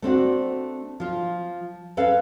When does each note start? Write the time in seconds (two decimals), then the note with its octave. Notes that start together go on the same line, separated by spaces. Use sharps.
0.02 A3 C4 D4 F#4
1.00 F3 F4
1.97 C#4 A4 B4 F5